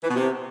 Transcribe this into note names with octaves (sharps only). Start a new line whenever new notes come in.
E3
B2
C3